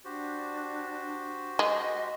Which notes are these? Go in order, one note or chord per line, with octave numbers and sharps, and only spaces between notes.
D4 F#4 G4 C5
G#3 D#5